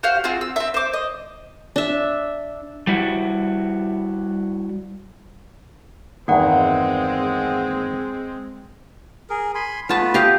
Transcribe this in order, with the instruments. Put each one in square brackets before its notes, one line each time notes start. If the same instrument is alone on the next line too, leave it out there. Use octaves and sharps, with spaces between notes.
[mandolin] F#4 G4 C5 F5
C4 F4 F#4 G#4
E6
C4 E5
C5 D6
D#5
[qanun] D4 E5
[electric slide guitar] G3 E4 F#4
[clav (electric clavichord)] E2 G2 D#3 [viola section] G#3 C4 [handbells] A#3 F#5
[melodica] G#4 A#4
G#5 B5 C6
[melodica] A3 B3 B4 [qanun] F4 A5
[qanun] G4 D#5 F5